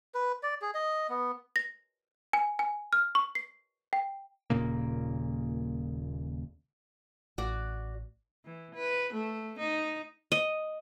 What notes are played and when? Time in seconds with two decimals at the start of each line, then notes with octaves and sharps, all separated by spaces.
0.15 B4
0.43 D5
0.62 G#4
0.74 D#5
1.10 B3
1.56 A#6
2.33 G#5
2.59 G#5
2.93 F6
3.15 C#6
3.35 C7
3.93 G5
4.50 D#1 A#2 C#3 A#3
7.38 A1 F#4 D5
8.45 E3
8.75 B4
9.14 A3
9.59 D#4
10.32 D#5